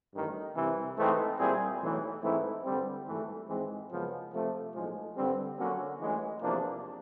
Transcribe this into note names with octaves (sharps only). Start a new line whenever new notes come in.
A1 G2 D#3
C2 C3 E3
G#2 E3 A3 C4 D#4
A#2 G3 C4 E4 G#4
B1 A2 E3
G#2 E3 A3 C4 E4
G2 D3 G3 C4
G#1 G2 E3 A3
G#1 G#2 E3 G#3 C4
F#2 C#3 F3 G#3 B3
C3 F3 A3
B1 A2 F3 G#3
G2 D3 G3 C4
D3 F#3 A#3 C#4 F#4
A1 A2 E3 G#3
E2 C3 F3 A#3 D4